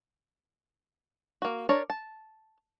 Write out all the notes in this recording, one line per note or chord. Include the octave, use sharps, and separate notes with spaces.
A#3 F#4
D4 A#4 C#5 A5 A#5
A5